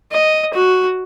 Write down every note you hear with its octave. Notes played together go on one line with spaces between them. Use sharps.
D#5
F#4